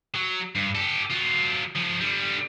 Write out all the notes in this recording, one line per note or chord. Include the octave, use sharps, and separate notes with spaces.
F#3
G2
G4 A4
F#3 F4
C#3 F3
D3 G3